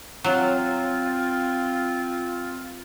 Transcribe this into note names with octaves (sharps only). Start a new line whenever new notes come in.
F#3 C4 F4